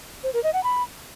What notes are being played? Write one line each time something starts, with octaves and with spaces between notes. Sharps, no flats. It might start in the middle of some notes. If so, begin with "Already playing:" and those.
C5
A#4
D#5
F#5
B5